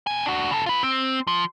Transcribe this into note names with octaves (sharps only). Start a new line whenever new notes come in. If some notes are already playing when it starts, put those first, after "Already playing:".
B2 G#5
D4 F#4
C#3 A4
F4 B4
C4
F3